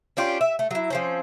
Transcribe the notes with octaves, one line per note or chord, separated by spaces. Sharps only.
C#4 D4 F4 G4
E5
A3
F#3 E4
F3 C4 C#4